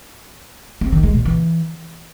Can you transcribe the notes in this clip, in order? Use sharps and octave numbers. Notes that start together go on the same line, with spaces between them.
C4
D#3
G#3
A#2
E3